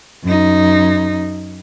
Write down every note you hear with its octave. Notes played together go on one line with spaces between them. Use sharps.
F#2 D#4